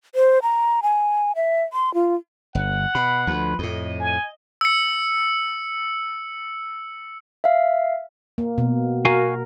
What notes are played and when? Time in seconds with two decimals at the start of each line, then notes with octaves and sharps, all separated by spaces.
0.15 C5
0.42 A#5
0.83 G#5
1.36 E5
1.73 C6
1.94 F4
2.55 G1 F#5
2.95 B2 B5
3.27 D2 F3 B4
3.59 F2 A2 D#5
4.00 G#5
4.61 E6 C#7
7.44 E5 F5
8.38 A#3
8.58 B2
9.05 F#4 A#4 F5 G#5